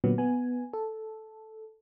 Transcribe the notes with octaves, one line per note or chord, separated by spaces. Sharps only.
A#2 D3 F#3 B3
B3 G#5
A4